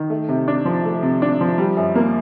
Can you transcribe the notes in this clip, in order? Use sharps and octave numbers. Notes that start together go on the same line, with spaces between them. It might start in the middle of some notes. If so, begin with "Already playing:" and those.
Already playing: D#3
A3
C3
D4
F3
A3
C3
D4
F3
G3
F#2
A#3